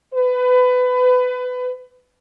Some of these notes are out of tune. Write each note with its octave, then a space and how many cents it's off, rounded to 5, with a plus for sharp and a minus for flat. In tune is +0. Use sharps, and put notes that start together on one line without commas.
B4 +25